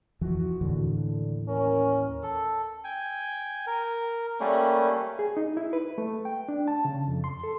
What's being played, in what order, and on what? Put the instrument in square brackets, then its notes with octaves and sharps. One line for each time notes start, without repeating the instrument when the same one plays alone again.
[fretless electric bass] F2 E3 F3 [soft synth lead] F#4
[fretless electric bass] D#2 A2 E3 [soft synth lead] D3
[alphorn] C#4 [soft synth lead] A#4
[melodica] A4
G5 G#5
A#4
G3 A3 A#3 C#4
[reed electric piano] G#4
D#4
E4
B4
A3
G5
D4
A5
C#3
F2
C6
A4